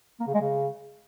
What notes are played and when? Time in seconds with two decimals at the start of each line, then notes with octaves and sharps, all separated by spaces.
0.20 A#3
0.27 C#3
0.34 G#3
0.41 C#3